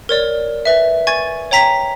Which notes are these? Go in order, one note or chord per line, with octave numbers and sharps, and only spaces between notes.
A#4 C#5 D5
B4 E5
G#5 C#6 G#6 A6
C#5 G5 A#5 B6